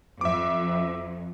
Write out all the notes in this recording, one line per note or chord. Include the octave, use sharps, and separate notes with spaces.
F2 E5 D6